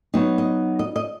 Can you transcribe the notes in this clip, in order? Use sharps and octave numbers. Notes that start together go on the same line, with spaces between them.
F#3 B3 D#4
D#5
D#5
D#5